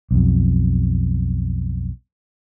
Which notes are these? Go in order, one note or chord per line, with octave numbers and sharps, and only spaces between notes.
B1 F2